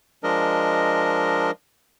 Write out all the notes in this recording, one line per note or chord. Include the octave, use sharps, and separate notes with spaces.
F3 G#3 D4 A#4 D#5